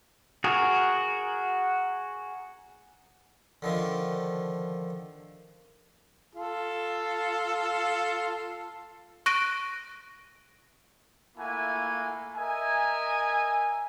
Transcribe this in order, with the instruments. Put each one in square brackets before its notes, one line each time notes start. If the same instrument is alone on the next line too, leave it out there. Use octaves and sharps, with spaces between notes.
[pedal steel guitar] F#4 G#4 A#4
[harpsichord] D3 D#3 F3
[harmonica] F4 A4
[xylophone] C#6 F#6 A#6 D7 D#7
[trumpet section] A3 A#3 E4 F4 F#5 G#5
A#4 D#5 E5 G#5